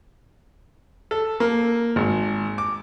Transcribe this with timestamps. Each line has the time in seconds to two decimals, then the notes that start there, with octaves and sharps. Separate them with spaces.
1.11 A4
1.40 A#3
1.96 G#1
2.58 D6